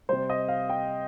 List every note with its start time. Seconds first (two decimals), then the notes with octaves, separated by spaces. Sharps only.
0.09 C3 G3 C5
0.30 D#5
0.48 F5
0.70 G5